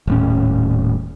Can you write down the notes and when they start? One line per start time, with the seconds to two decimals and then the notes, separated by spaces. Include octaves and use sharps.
0.07 D#1 A2 C#4